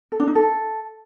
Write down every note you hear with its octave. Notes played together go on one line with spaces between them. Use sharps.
A4
D4
D#4
A4